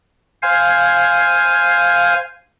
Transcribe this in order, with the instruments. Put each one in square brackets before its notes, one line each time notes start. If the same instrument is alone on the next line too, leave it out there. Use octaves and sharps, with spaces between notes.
[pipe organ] C5 F5 G#5